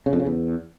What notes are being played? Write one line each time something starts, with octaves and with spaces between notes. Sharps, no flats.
C#3
F2
C#3
E2